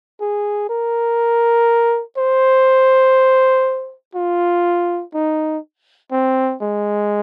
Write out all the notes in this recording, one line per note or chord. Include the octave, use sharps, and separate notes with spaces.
G#4
A#4
C5
F4
D#4
C4
G#3